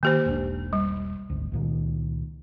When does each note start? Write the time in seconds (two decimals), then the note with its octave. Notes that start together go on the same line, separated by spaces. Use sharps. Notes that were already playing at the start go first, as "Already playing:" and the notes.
0.03 D#3 A#3 G4 C5
0.26 E1 B1 D4
0.73 G3
1.30 G#1 D2
1.52 C#2 A#2 D#3